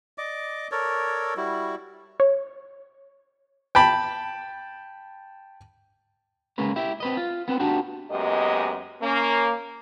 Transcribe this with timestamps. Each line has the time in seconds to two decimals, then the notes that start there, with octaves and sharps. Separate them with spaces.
0.18 D5 D#5 D6
0.72 A4 A#4 C#5 D5
1.37 G3 E4 F#4
2.20 C#5
3.75 G5 A5 B5
6.58 C#2 G#3 A#3 C#4 B4
6.76 E4 G4 E5
7.00 C4 B4 D#5
7.17 F4
7.48 B3 C4 B4
7.60 B3 D4 D#4 F#4 G4
8.11 F#2 G#3 A#3 B3 G4 D#5
9.02 A#3 C#4